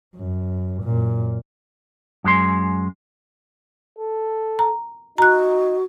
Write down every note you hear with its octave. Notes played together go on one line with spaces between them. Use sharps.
F#2
F#2 A#2
F#2 G#3 C6
A4
A#5
D#4 F#4 A#5 F#6